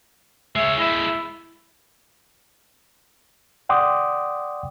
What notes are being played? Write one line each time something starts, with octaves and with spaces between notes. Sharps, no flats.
G#3 C#5 E5
G#3 E4 E5
D5 F#5 G5 C6 D6 D#6